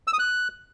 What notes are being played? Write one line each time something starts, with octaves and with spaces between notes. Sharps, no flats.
E6
D#6
F#6